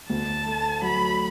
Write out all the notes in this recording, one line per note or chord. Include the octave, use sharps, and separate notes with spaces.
D2 A5
A3
F#3 B5